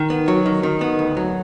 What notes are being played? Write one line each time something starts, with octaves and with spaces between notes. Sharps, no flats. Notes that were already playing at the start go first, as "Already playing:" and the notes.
Already playing: D#3
B3
F#3
D#3
D#3
B3
D2
F#3